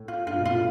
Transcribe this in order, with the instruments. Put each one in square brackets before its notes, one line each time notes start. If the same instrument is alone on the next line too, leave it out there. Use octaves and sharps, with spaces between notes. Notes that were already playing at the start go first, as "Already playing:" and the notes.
Already playing: [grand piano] A2
[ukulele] F4
[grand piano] G2 [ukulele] F4
[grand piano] B2
[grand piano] A2 [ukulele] F4